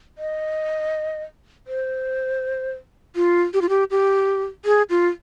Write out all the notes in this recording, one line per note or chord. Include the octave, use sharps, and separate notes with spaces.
D#5
C5
F4
G4
F4
G4
G4
G#4
F4